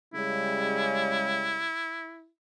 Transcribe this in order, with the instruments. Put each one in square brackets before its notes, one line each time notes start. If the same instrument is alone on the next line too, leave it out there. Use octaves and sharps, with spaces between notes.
[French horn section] C#3 G3 G#3 [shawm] E4